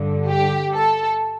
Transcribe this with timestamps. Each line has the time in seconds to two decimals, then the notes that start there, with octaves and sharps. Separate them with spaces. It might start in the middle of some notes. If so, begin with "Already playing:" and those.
Already playing: G2 D3
0.28 G4
0.74 A4